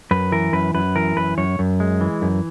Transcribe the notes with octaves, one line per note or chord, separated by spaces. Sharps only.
F#2 B4
E3 A#4
F#2 B4
F#2 B4
E3 A#4
F#2 B4
F#2 C#5
F#2
G#3
E3
F#2